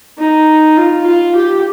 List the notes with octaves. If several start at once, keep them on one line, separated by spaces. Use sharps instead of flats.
D#4
F4
F4
G4